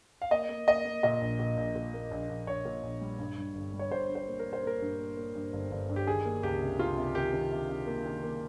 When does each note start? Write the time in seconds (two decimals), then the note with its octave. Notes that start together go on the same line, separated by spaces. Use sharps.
0.22 F5
0.31 A#3 D#5
0.49 A#3
0.68 A#3 D#5
0.85 A#3
1.03 A#2 D#5
1.22 A#1
1.39 A#2
1.57 A#1
1.75 A#2
1.94 A#3
2.11 A#1
2.30 A#1
2.47 A#1 C#5
2.65 A#2
2.83 A#1
3.01 G3
3.19 G2
3.37 G2
3.55 G1
3.73 G3
3.79 C#5
3.91 G2 C5
4.09 G2
4.15 C5
4.27 A#3
4.39 A#4
4.45 A#3
4.53 C5
4.63 A#3 A#4
4.82 G2
4.99 A#3
5.17 A#3
5.35 G2
5.53 G1
5.71 G1
5.89 G2
5.96 G4
6.07 D#3 G#4
6.25 A#3
6.43 C#2 G4
6.61 C3
6.79 C#2 F4
6.97 C3
7.15 D#3 G4
7.33 D#3
7.51 C3
7.70 C3
7.87 A#3
8.05 D#3
8.23 A#3